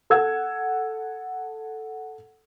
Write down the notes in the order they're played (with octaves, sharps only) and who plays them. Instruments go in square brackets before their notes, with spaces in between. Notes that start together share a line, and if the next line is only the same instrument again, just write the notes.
[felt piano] A4 F#5 E6 G#6